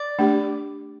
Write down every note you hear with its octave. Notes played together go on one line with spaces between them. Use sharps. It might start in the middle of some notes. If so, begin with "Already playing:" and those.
Already playing: D5
A3 D4 G4